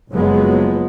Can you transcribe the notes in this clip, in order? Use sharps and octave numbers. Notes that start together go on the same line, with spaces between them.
F#1 F3 F#3 G#3 B3